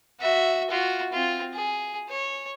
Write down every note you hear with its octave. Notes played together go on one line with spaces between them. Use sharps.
F#4 E5
F4 F#4
C4 F4
G#4
C#5